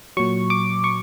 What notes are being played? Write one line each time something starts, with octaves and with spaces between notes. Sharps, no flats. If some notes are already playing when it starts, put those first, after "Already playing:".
A#2 F#3 C#6
D6
C#6